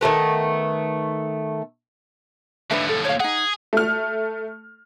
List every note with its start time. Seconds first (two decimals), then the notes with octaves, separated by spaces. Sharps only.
0.01 D#3 F3 A3 B3
2.71 D#2 A2 D4 B4 E5
2.89 A4
3.05 C#5 F5
3.20 D#4 G#4 F#5
3.73 A3 F6